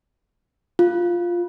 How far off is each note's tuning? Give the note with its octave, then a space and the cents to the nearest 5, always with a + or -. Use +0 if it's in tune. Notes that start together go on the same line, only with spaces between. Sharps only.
F4 +0